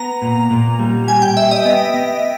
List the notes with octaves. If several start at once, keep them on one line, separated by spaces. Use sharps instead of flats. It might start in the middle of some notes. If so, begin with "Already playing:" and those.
Already playing: B3 A#5
A#2
A#2
G3
G4 G#5
G5
G4 E5
D#5
B3
B3